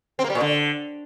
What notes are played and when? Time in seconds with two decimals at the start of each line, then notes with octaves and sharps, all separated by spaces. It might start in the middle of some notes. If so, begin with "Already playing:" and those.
0.19 C4
0.24 A#3
0.30 G3
0.35 A#2
0.41 D3